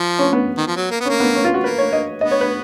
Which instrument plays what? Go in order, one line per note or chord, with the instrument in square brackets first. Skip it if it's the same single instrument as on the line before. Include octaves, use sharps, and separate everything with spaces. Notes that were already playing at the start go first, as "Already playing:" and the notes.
Already playing: [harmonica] F3
[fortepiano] C#4
B3
[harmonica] D#3
F3
F#3
A#3
B3
[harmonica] A#3 [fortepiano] C#4
[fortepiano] B3
C#4
F4
F#4
[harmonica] A#3 [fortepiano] B4
[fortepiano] C#5
D#5
[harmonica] B3 [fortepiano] D#5
[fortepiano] C#5
B4